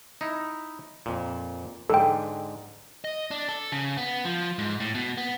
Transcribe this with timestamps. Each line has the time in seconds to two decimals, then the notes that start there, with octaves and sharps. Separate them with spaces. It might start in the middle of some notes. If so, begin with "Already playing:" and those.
0.21 D#4 E4
1.06 F2 A#2
1.90 G#2 D3 A4 G5
3.04 D#5
3.31 D4
3.49 A4
3.72 C#3
3.97 B3
4.25 F3
4.59 G#2
4.80 A2
4.95 B2
5.17 B3